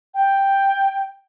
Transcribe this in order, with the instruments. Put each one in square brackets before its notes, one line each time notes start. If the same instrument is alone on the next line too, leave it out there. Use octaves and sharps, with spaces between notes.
[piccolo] G5